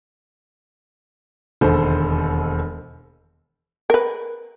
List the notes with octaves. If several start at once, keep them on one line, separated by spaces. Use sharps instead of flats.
E1 D#2 D3 A4 C5
A#4 B4